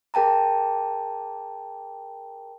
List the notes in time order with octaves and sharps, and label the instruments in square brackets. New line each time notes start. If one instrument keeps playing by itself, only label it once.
[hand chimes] G#4 A#4 G5 A5 A#5